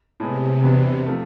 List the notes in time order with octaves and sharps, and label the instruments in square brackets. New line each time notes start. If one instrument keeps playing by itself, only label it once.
[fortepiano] A2 G#3 B3 [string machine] C3
[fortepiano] E2 B2 B3 D4
C3 F3 A3